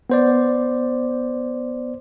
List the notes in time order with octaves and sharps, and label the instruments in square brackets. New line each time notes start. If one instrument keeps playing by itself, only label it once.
[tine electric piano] B3 C5 D5